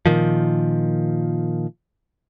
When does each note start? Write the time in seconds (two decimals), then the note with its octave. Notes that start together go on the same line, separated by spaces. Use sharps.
0.06 A#2 D#3 F3